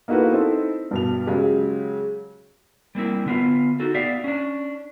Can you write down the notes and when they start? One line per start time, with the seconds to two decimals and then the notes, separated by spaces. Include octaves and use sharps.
0.08 A#3 D#4 E4 F#4 A4 B4
0.32 C4 D#4 E4 A4 C5
0.91 G2 B2 F7
1.27 C#3 F#3 G#3 G4
2.95 G3 A#3 C4 E4
3.26 D3 B3 F4
3.80 D#4 F#4 A4
3.95 B3 G4 D5 E5 F5
4.24 C#4 D4